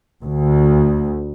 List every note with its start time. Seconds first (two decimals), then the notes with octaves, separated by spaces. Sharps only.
0.23 D2